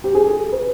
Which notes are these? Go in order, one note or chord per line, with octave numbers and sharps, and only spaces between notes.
G4
G#4
A4
B4